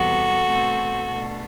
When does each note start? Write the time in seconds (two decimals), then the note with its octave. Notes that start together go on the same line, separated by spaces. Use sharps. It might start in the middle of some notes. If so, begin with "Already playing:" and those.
Already playing: E2 C3 G3 B3 F#4 A4
0.45 B2 A3 C4
1.10 B2 A3 D4